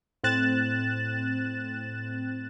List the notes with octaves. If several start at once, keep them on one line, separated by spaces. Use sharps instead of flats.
A2 C4 F#6 A6 E7